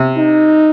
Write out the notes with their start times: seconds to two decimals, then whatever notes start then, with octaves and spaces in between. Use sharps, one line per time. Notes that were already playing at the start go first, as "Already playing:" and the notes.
Already playing: C3
0.17 D#4